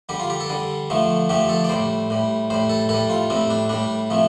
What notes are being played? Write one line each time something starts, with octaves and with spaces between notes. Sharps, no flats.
D3 G3 G4
F4
G4
A4
D3 G3
D3 F3 A3
D3 F3 A3 G4
A4
D5
A2 G3 C5
A2 G3
A2 G3 C5
A4
A2 G3 A4
F4
A2 G3 C4
D4
A2 G3 D4
C3 F3 A3